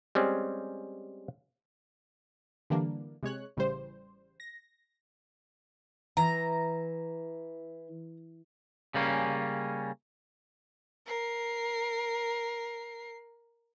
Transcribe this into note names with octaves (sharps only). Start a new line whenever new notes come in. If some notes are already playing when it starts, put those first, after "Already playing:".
G3 G#3 C4 C#4
D3 E3 G3 A#3 D4
C3 G#3 C#5 F#6
A1 C#3 E3 G3 C5
A#6
E3 A#5
C#3 G3 A#3 C#4
A#4 C7